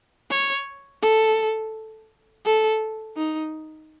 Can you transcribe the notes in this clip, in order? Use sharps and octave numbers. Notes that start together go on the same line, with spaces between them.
C#5
A4
A4
D#4